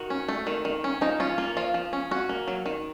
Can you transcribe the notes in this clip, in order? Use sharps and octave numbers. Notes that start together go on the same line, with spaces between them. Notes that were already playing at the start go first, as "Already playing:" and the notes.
Already playing: D#3 F#4
C#4
A3
D#3
D#3
C#4
F3 D#4
C#4 F4
A#3 F4
F3 F4
F3
C#4
C#4 F#4
A#3
F#3
D#3